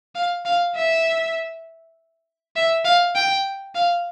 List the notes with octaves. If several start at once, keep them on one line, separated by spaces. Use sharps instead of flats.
F5
F5
E5
E5
F5
G5
F5